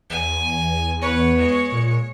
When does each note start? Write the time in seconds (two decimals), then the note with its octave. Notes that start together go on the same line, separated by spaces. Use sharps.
0.10 E2 G#5
1.02 B3 B4 C#5
1.38 G#3
1.72 A#2